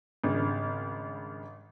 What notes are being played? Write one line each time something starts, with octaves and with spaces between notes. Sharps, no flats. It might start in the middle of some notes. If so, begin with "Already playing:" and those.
G#1 G2 C#3